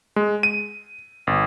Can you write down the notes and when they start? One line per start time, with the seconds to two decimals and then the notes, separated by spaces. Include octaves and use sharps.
0.16 G#3
0.43 D#7
1.27 G1